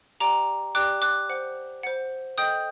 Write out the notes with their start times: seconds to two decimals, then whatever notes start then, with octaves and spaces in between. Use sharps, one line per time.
0.20 G4 D5 G5 A#5 D6
0.75 G4 D5 G5 D6 F#6
1.02 D6 F#6
1.29 C5 F#5
1.83 C5 F#5
2.38 A4 D#5 G5 D#6 G6